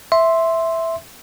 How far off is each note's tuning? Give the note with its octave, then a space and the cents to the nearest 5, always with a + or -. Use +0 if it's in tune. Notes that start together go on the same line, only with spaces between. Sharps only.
E5 +0 C6 +0